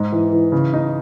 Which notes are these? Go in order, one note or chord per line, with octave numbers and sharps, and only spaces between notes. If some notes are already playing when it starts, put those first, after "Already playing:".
Already playing: G#2
E3
E3
C#3
D#4